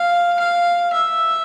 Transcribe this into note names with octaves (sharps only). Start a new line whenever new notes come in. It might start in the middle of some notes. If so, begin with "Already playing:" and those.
Already playing: F5
F5
E5